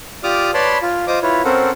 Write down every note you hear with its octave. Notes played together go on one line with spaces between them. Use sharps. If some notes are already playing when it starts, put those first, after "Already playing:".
F4 G4 D5 D6 D#6 F6
B4 C#5 D5 A5 B5 C6
F4
F4 C5 D#5 D6 D#6
E4 F4 B4 C#5
C4 C#4 A4 A#4 C5 F#5